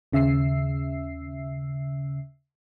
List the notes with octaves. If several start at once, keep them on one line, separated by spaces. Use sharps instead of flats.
D#2 C#3 E5 E6 C7